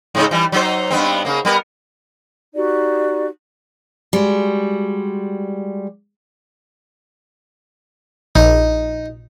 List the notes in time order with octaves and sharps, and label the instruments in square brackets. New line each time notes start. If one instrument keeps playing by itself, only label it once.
[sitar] G#2 C#3 D#4
E3 G3
F#3 D#4 C5
G2 B3 C4
C#3 A#3
G3 B3 A#4
[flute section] D#4 F#4 G4 D5
[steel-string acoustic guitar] G3 G#3 F#4
[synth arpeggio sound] A#1 [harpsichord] D#4